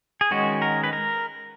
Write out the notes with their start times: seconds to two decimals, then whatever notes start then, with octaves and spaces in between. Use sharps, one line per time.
0.21 G#4
0.31 D#3 G#3 C#4 F#4
0.62 A#4
0.84 B4
0.93 A#4